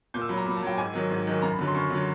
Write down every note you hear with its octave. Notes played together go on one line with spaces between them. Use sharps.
A#2 G6
E6
F#3 B5
A#5
A#2 B5
A5
F#3 G5
G#2 G#5
D#3 F#3
G#2
D#3 F#3
F#2 A#5
B5
D3 F#3
C6
F#2 C#6
D3 F#3